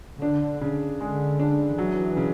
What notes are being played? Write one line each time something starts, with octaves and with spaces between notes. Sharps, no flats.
D3 D4
C#3
D3 G#3
D4
E3 F#3
C#3